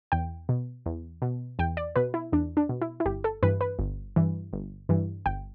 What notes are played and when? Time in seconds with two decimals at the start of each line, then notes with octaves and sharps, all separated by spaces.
0.12 E2 G5
0.49 B2
0.86 E2
1.22 B2
1.59 E2 G5
1.77 D5
1.96 B2 B4
2.14 E4
2.32 E2 D4
2.57 D4
2.69 B2
2.82 E4
3.00 E4
3.05 G1 G4
3.24 A4
3.43 G2 E3 B4
3.61 B4
3.79 G1
4.16 G2 E3
4.53 G1
4.89 G2 E3
5.26 G1 G5